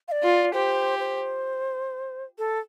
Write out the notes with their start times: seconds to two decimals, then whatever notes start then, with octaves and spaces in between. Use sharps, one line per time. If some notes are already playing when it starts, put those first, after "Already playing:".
0.08 F5
0.12 D5
0.23 F4
0.53 G4 C5
0.99 C5
2.38 A4